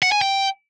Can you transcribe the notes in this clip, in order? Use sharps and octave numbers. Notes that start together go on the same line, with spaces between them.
F#5
G#5
G5